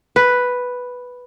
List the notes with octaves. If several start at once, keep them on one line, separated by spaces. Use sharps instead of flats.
B4